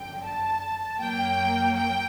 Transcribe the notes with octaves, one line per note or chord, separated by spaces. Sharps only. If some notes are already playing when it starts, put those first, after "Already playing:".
Already playing: G1 F#2 D3 G5
A5
F#2 F#3 A#3 G5
G5